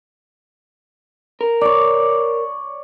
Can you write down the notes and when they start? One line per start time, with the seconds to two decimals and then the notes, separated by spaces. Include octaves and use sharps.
1.41 A#4
1.61 C#5 D5